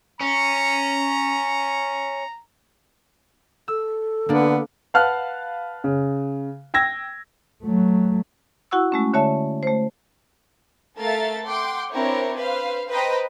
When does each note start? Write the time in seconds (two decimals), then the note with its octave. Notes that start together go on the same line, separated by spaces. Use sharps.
0.21 C#4 A#5
3.68 A4 E6
4.29 D3 A#3 B3 D4
4.94 B4 F5 F#5 A5 F6 F#6
5.84 C#3
6.74 G5 E6 G#6 A#6
7.64 F#3 A3
8.71 E4 F#4 F#5 C#6 E6
8.92 G#3 A3 C#4
9.14 D3 C#5 E5 A5
9.63 A3 C5
10.98 A3 A4 A#4 E5 F5 A6
11.45 F#5 G5 C6 D6
11.92 C4 D4 E4 A#4 C#5
12.36 B4 C5 F5
12.90 B4 C5 D#5 G5 A#5 B5